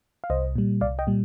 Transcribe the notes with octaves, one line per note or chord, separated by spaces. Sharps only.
F5
C2 C5 D#5
A#2 G3
C2 D5 F5
D#5 G5
A#2 G3